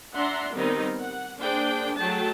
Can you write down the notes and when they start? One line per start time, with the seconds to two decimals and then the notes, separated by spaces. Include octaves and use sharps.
0.15 D4 E5 F#5 A#5 C6
0.55 D#3 G3 B3 C4 D#4
1.00 F#5
1.40 A#3 D4 G#4 C5 G5
1.98 F#3 A3 G#4 G5 A5